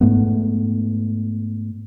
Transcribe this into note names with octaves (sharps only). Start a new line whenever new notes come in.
G#2 A3 B3